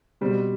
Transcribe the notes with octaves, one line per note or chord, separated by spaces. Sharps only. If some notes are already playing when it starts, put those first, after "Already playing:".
B2 G3 C4